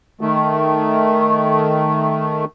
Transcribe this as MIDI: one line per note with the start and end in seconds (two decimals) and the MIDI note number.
0.21 2.45 51
0.21 2.45 57